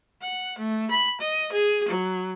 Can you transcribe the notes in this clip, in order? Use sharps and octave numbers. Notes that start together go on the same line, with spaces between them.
F#5
A3
B5
D#5
G#4
F#3